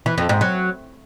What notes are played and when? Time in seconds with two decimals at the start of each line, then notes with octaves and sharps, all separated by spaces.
0.06 E3
0.18 F2
0.29 G#2
0.41 F#3